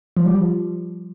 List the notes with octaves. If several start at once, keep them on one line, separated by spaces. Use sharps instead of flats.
F3
G3
F3